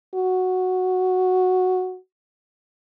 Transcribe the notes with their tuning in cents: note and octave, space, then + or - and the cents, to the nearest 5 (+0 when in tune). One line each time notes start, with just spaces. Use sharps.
F#4 -5